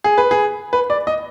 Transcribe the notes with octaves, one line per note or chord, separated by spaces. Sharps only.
G#4
B4
G#4
B4
D5
D#5